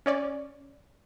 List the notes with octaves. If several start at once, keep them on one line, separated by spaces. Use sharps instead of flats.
C#4 C#5 D5